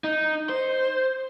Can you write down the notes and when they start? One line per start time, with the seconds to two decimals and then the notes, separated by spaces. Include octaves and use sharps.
0.04 D#4
0.49 C5